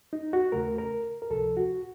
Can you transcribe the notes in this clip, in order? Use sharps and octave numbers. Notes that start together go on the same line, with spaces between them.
D#4
F#4
D#2 C#3 A3 A#4
A#4
A#4
C#2 C3 F3 A4
F#4